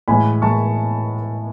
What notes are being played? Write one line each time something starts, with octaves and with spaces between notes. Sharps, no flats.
A2 E3 G#3 G#5 B5
A2 E3 G#3 A5 C#6